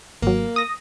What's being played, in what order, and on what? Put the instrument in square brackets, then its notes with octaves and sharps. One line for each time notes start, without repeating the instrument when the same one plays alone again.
[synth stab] G#1 F#3 [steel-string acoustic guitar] A#3
[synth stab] D#6 A#6